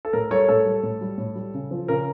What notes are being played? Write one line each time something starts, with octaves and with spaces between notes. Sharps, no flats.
A4
A2 A#4
G3 A4 C#5
A2 A4
G3
A2
G3
A2
G3
C#3
F3
C#3 A#4